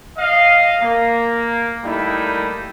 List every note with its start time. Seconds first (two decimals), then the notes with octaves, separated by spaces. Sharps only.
0.18 D#5 F5
0.81 A#3
1.83 G3 A3 A#3 D#4 E4